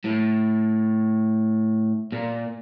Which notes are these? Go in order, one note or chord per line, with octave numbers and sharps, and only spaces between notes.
A2
A#2